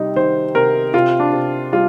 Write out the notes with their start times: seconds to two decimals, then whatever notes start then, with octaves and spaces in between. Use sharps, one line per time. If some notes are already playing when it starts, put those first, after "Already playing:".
Already playing: C3 G3 D#4
0.16 D#3 C5
0.54 C3 A#4
0.93 C3 F4
1.20 D4
1.33 C3
1.72 G3 F4